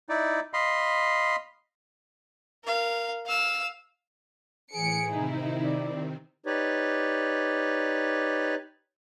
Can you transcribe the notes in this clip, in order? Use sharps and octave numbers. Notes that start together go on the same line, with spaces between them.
D#4 E4 D5
D#5 F5 B5 C6
A#4 F5
F5 E6
A2 E3 G#4 C#7 D7
C3 D#3 C4 D#4 E4
D5
D#4 G4 B4 C#5 D5